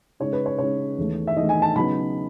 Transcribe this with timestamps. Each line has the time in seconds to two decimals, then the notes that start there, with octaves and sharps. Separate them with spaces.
0.20 C#3 G#3 D#4 C#5
0.33 B4
0.46 C#5
0.58 C#3 G#3 D#4 C#5
0.98 E2 D#3 A3
1.27 E5
1.36 E2 D#3 A3 D#5
1.49 G#5
1.62 A5
1.75 C#3 F#3 B3 D#4 B5